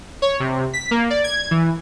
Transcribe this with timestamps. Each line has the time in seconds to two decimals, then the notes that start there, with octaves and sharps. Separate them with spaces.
0.22 C#5
0.40 C3
0.73 B6
0.91 A#3
1.10 D5
1.24 G#6
1.51 E3